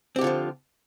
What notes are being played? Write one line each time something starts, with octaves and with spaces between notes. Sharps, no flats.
D3 F3 C4 F4 G4